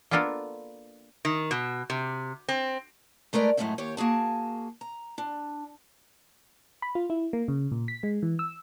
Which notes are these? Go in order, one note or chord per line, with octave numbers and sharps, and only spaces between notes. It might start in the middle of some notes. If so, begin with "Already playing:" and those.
A#3 B3 D4 F4 A4 A#4
D#3
B2
C3
C4
G#3 A3 A#4 B4 D5
F#2 A2 G#3 A3 D#4 A4
D#2 G4 C#5
A#3 F#4 G#4 A5
A#5
D4
B5
F4
E4
A#3
C#3
A#2
B6
G#3
E3
E6